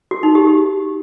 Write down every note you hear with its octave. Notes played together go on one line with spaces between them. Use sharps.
F#4
D#4
G4
G4